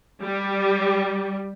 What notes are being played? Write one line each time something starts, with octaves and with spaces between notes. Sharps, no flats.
G3